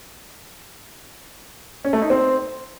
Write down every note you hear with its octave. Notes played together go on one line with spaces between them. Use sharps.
C#4
A3
D#4
C4